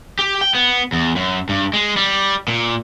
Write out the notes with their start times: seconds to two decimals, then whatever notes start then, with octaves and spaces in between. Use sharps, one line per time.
0.19 G4
0.41 G5
0.55 B3
0.93 E2
1.16 F#2
1.49 G2
1.74 G#3
1.97 G3
2.48 A#2